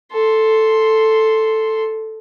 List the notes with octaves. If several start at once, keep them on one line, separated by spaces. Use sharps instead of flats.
A4 C6